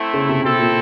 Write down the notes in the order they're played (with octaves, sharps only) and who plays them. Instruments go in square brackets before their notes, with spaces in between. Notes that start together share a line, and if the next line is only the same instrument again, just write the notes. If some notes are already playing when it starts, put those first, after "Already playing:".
Already playing: [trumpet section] A3 C4 E4
[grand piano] C#3
C3
[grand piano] B2 [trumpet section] C4 E4 A4
[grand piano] A#2